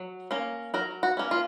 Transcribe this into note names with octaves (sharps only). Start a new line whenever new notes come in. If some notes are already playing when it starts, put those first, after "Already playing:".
Already playing: F#3
A#3 C#4
F#3 A#4
F#4
A#3 C#4
F4